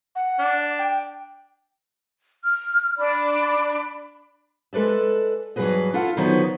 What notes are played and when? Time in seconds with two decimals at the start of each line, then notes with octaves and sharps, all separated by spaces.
0.16 F#5
0.39 D4
0.79 G5
2.44 F6
2.98 D4 D5 B5
4.73 G#3 A4 B4 D5 E5
5.56 G2 E3 F#3 G#4 B4 D#5
5.93 D4 E4 F4 A4 F5 F#5
6.17 D3 D#3 F3 F#3 B3 D#4